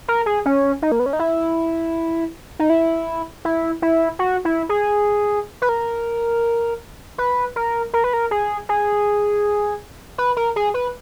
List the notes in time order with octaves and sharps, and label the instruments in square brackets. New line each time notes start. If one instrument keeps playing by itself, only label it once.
[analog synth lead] A#4
G#4
C#4
D#4
A#3
B3
C#4
D#4
E4
D#4
E4
E4
E4
F#4
E4
G#4
B4
A#4
B4
A#4
A#4
B4
A#4
G#4
G#4
B4
A#4
G#4
B4